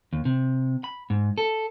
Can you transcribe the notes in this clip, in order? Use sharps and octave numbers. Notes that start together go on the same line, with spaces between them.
D#2
C3
B5
G#2
A4